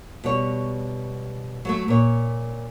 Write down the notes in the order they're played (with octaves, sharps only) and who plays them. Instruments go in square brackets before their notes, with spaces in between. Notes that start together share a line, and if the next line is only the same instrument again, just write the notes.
[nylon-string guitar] B2 G3 C#5
F#3 G#3 A3
A#2 C#5